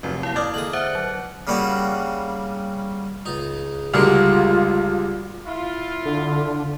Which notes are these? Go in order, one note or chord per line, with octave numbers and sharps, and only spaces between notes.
F1 F#2 F4
A#3 E4 F5
D5 D#6 F6 G#6
D3 G#3 A#3 D#6 F#7
C5 E5 F#5
F#3
C#3 G3 A#3 F#4
C#2 D#4
C#2 D3 G3 G#3 F4 F#4 A#4
E4 F4
D3